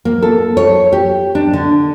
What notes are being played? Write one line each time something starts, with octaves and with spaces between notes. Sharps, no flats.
A#3
A4
C#5
G4
D4
D3